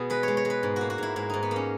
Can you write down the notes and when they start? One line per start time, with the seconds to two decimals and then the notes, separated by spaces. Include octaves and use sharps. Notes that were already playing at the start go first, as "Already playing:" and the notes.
Already playing: B2 B3 G#4
0.10 G#3 B4
0.23 G#3 C#5
0.37 C#5
0.45 G#3
0.50 B4
0.63 G#2
0.76 A#3 F#4
0.90 F#4
0.98 G#2 E4
1.16 G#2 E4
1.30 G#2 D#4
1.43 B3
1.51 A#3
1.56 C#4